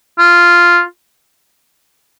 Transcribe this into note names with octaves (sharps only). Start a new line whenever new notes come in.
F4